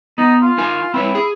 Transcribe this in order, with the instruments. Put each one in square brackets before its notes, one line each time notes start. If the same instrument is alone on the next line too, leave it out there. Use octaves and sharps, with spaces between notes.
[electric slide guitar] B3 [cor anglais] D#4
[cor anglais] F4
[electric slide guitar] D#4 A#4 G#5
[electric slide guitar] C4 B4 C#5 [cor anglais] E4
[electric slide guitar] G#4